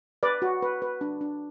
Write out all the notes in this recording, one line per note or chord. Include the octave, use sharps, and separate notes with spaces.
B4 D5
F#4
B4
B4
D4
D4